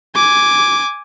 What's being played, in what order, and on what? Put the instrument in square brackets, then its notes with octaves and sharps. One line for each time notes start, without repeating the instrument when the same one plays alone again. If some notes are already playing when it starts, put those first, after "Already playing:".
[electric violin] G#5 D6